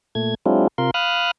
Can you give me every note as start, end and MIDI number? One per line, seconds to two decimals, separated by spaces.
0.15 0.35 46
0.15 0.35 57
0.15 0.35 92
0.46 0.67 54
0.46 0.67 56
0.46 0.67 60
0.46 0.67 62
0.46 0.67 64
0.46 0.67 65
0.78 0.91 48
0.78 0.91 65
0.78 0.91 70
0.78 0.91 84
0.94 1.31 77
0.94 1.31 83
0.94 1.31 87
0.94 1.31 89
0.94 1.31 90